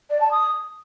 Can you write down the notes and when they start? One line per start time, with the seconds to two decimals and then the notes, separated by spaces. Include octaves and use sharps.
0.10 D5
0.21 A5
0.31 D#6